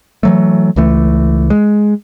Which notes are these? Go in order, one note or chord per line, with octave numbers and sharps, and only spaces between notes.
E3 F#3 A3
C#2 E3 A3
G#3